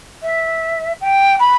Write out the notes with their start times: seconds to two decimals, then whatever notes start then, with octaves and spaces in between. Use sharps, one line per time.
0.22 E5
1.00 G5
1.39 B5